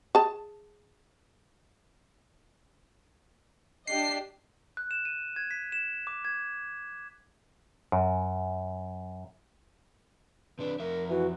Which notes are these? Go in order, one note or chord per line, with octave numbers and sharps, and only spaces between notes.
G#4 A5
D4 G4 D#5 C7
F#6
E7
D#7
G#6
B6
E7
D6
G#6
F#2
C3 D4 B4
F2 A#4 E5
E3 F#4